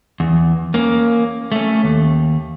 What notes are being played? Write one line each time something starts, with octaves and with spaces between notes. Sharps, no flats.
E2
A#3 C#4
A3 C#4
D#2